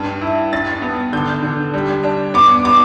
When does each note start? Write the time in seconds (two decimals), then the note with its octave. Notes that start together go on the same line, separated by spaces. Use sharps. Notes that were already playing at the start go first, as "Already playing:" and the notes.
Already playing: G2
0.21 E4
0.53 G2 A6
0.82 B3
1.13 D3 G6
1.43 D3
1.74 G3
2.04 D4
2.34 B3 D6
2.65 B3 D6